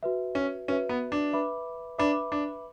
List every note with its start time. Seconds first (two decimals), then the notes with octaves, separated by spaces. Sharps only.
0.03 F#4 B4 E5
0.35 C#4
0.68 C#4 F#4 B4 E5
0.89 B3
1.12 D4
1.33 B4 E5 B5 D6
1.98 D4 B4 E5 B5 D6
2.32 D4